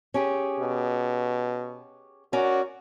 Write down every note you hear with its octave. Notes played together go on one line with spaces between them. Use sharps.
C#4 G4 G#4
B2
C#4 F#4 A#4 D5